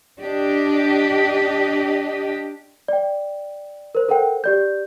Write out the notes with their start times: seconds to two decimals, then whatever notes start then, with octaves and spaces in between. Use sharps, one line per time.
0.20 D4 G4 D#5
2.88 D5 G5
3.95 A#4 C5
4.09 A4 A#4 C5 F#5 G5
4.44 G4 D5 G6